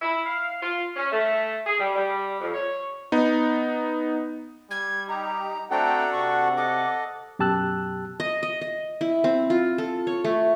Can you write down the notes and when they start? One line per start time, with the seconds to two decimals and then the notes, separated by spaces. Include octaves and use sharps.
0.02 E4
0.26 F5
0.62 F4
0.96 C#4
1.12 A3
1.67 G#4
1.78 G3
1.96 G3
2.41 F2
2.54 C#5
3.12 B3 D#4
4.71 G3 G#6
5.08 D#4 G4 A#5
5.71 A3 C4 D4 F#4 A4 F#5 G5 A#5
6.12 C3 C#6
6.57 A4 D#5 D6
7.39 F#2 B2 G4 A5 E6 F#6
8.20 D#5
8.43 D#5
8.61 D#5
9.01 E4
9.24 C4
9.50 F4
9.78 A4
10.07 C#5
10.25 A3